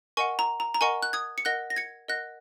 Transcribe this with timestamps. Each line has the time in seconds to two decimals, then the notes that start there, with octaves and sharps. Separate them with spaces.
0.17 A#4 D#5 F#5 G#5 C#6
0.39 A#5
0.60 A#5
0.74 A#5
0.81 A#4 D#5 F#5 G#5 C#6
1.03 F#6
1.13 D#6 G#6
1.38 C#7
1.45 A#4 D#5 F#5 F#6 A#6
1.70 A#6
1.76 G#6 C#7
2.08 A#4 D#5 F#5 F#6 A#6